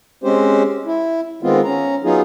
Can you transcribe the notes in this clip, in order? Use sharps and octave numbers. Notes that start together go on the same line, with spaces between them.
G#3 C4 C#4 G4 C5
E4
D#3 G#3 B3 C4 F4
C#4 A#5
F#3 B3 D#4 F4 G#4